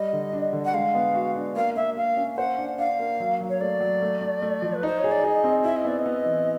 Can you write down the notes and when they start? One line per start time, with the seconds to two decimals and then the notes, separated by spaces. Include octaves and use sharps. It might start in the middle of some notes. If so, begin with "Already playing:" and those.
Already playing: G3 D#5
0.13 D3
0.33 D4
0.53 D3
0.65 F#5
0.74 G#3 F5
0.95 B3
1.14 F#4
1.35 D4
1.56 A#3 F5
1.76 A#3 E5
1.97 A#3 F5
2.17 C#4
2.37 C5 F#5
2.58 D4
2.79 D4 F5
2.99 A#3
3.20 F#3
3.40 F#3
3.49 C#5
3.61 A3 D5
3.81 F#3
4.02 A3
4.21 A3
4.42 A3
4.62 F3
4.74 B4
4.83 D#4 C5
4.99 C#5
5.04 G#4
5.12 D5
5.24 G#4 D#5
5.44 C4
5.65 E4 E5
5.76 D#5
5.85 B3 D5
5.99 D#5
6.06 B3
6.26 E3